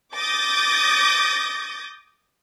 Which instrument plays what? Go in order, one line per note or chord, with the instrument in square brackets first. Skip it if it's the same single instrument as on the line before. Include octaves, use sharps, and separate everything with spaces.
[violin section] D6 D#6 G6 A6 A#6